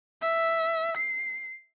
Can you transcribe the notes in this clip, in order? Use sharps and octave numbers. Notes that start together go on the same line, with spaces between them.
E5
C7